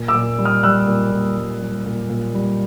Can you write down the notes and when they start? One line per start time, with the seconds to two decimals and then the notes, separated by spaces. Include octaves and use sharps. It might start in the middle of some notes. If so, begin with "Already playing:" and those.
Already playing: A#2
0.08 D6 E6
0.15 A#2
0.38 G3
0.45 D#6 F6
0.63 G3 E6 F#6
0.88 A#2
1.12 A#2
1.37 G3
1.62 G3
1.86 A#2
2.10 A#2
2.34 G3